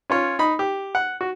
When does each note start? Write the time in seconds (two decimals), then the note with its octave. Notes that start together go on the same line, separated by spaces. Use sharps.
0.10 C#4 F4 C#5
0.39 D#4 B5
0.59 G4
0.95 F#5
1.21 F#4